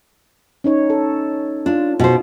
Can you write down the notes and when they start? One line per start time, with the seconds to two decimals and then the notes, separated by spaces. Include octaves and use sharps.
0.64 C#4 D#4 C#5
0.90 A4
1.66 D4 F4
2.00 B2 C5